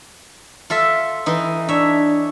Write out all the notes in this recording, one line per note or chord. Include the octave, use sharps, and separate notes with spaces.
F4 A4 E5
E3 D#4
D4 C#5 E5